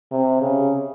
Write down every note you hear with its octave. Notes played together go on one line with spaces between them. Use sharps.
C3
C#3